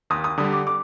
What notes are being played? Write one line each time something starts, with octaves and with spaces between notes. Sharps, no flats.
D#2 D#6
D#6
D3 G3 D#6
D6
D6